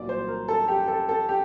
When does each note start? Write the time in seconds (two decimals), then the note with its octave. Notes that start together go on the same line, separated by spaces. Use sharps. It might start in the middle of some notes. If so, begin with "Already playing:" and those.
Already playing: C2 A#2 F#3 D5
0.09 C5
0.28 A#4
0.48 A4
0.68 G4
0.88 A4
1.09 A4
1.29 G4